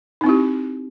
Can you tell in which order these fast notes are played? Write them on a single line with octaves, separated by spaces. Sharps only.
D#4 C4 E4 G4